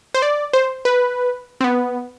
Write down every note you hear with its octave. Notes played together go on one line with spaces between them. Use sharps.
C5
D5
C5
B4
C4
B3